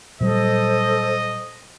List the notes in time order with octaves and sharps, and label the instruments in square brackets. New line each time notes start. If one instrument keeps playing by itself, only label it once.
[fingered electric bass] A#2 F#3 G3 [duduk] A4 [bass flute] C5 [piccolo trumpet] D#5